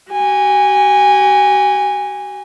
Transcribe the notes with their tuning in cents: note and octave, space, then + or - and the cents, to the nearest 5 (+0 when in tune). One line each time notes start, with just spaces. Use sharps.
F#4 +45 G#5 -20